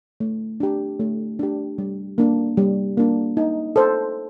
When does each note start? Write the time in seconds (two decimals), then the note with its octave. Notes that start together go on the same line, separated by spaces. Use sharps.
0.20 A3
0.60 D4 G4
1.00 A3
1.39 D4 G4
1.78 G3
2.18 A#3 D4
2.57 G3
2.97 A#3 D4
3.37 D#4
3.76 A4 C5